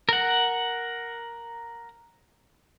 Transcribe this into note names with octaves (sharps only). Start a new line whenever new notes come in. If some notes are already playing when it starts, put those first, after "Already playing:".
A#4 F#5